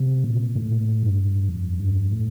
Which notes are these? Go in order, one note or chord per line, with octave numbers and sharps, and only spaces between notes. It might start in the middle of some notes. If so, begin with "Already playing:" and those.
Already playing: C3
A#2
A2
G2
F2
G2
A2